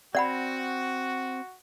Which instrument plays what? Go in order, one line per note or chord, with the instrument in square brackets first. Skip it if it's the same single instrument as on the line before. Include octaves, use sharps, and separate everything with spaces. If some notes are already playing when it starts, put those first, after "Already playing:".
[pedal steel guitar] C4 [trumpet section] F#4 [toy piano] D5 F#5 B5